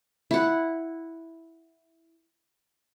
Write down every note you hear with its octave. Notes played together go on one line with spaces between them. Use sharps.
E4 F#5